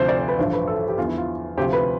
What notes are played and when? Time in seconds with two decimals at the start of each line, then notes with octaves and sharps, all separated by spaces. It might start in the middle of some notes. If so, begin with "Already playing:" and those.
Already playing: D2 C3 F3 C5
0.08 D5
0.19 C5
0.28 B4
0.39 A1 G2 D3 F3 C5
0.53 B4
0.67 A4
0.78 A4
0.88 G4
0.98 E2 D3 F3 F4
1.08 E4
1.18 F4
1.57 D2 C3 F3 G4
1.73 B4